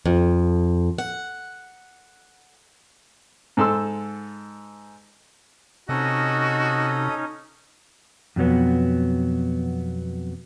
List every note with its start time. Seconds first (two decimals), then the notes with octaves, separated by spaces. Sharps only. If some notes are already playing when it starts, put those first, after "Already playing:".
0.06 F2
0.98 F#5
3.57 G#2 A4 C6 E6
5.89 C3 C#4 D#4 F#4 A4 D#5
8.36 F2 B2 F#3 B3